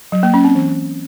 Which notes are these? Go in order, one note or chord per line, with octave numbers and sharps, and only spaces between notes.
F#3
A#3
C#4
C4
E3